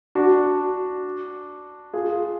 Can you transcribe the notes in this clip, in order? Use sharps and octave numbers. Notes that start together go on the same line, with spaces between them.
D4 F#4
F4 G#4